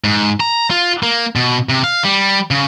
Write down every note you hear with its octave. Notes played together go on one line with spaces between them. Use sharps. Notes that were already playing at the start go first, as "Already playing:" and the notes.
G#2
A#5
F4
A#3
B2
C3
F5
G3
C#3